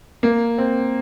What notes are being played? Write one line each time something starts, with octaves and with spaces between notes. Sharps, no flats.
A#3
C4